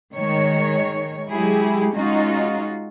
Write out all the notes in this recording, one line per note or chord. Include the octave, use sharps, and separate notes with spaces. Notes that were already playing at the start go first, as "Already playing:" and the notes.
D#3 G#3 C#5
F#3 G#3 E4 G4 G#4
G#3 C#4 D#4 F4 F#4